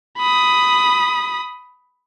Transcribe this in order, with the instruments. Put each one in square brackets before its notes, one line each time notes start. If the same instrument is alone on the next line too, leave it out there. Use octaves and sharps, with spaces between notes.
[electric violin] B5 D#6